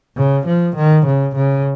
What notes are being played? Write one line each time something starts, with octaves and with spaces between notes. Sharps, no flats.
C#3
F3
D#3
C#3
C#3